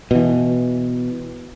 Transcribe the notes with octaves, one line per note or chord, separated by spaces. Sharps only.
B2 E3